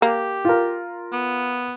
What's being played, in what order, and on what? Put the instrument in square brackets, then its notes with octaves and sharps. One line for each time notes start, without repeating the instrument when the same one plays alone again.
[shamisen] A#3 [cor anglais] G4
[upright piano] F4 A#4
[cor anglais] B3